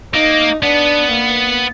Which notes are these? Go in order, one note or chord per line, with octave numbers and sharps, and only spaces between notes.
A#3 D#4
B3 D4
A#3